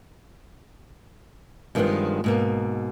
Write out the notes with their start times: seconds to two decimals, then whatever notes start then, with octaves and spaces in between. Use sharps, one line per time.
1.75 G2 D#3 F3 G#3 B3 C4
2.24 G#2 B2 A#3